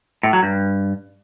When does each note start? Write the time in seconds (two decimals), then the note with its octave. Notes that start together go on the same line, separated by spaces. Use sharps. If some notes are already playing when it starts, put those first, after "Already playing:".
0.23 A2
0.33 F#3
0.43 G2